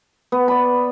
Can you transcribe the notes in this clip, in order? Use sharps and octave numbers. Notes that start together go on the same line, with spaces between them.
B3
D5 B5